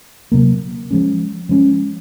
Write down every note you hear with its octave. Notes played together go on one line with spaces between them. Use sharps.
C3 F#3 A#3
F3 G#3 C#4
F3 G#3 C#4